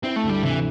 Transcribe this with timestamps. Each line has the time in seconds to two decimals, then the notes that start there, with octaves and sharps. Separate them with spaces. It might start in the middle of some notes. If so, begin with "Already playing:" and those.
0.03 C4 E4
0.16 A3
0.23 D2
0.29 G3
0.42 C3 E3